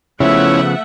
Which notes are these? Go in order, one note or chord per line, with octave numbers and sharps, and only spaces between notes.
C#3 F3 A3 B3 C#4 E4 E5 F#5